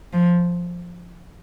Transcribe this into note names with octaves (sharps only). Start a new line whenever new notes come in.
F3